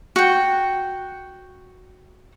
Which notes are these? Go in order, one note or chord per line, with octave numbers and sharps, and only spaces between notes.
F#4 G5